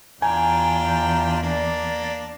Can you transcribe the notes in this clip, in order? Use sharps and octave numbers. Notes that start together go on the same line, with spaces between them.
E2 D4 F4 G5 G#5 A#5
A#3 D4 D5